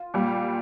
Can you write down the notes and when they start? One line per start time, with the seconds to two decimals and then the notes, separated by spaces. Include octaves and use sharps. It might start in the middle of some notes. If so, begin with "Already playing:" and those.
Already playing: F4
0.14 A#2 G3